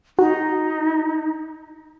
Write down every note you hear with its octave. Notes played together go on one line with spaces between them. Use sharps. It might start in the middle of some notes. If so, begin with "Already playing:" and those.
D#4 F#4